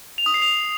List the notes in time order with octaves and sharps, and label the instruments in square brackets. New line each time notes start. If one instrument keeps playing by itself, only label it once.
[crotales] F7
D#6
C7
F7